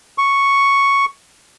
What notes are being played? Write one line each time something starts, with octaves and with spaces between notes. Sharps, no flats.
C#6